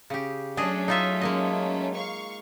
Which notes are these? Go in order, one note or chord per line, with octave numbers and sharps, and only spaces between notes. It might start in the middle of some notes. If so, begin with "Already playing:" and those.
C#3 G4
F#3 A3 C#4 D4 G#4 D#5
D#4 F4 E5
G#3 A#3 D#5
F5 C#6